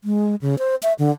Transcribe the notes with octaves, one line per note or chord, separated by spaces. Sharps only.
G#3
C#3
C5
E5
D3